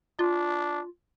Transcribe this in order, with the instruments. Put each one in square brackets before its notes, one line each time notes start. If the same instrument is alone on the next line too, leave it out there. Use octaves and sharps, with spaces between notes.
[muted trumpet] D4 [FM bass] F4